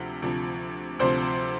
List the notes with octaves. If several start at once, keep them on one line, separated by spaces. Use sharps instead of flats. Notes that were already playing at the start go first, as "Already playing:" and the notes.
Already playing: D2 C3 F3
D2 C3 F3
D2 C3 F3 C5